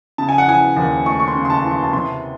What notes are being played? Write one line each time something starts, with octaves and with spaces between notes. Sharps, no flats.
C#3 A5
G#5
F#5
E3 G#5
D#2
A3 C#6
C#6
C6
C#3
C6
A5
E3
C6
A5
C3 C6